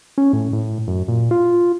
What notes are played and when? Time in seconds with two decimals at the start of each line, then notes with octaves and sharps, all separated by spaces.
0.18 C#4
0.33 A2
0.53 A2
0.87 F#2
1.08 A#2
1.31 F4